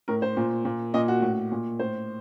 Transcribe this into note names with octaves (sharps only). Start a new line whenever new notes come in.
A2 A#4
C5
A#2
A#2
A#2 D#5
F#4
A2
A#2
A2 C5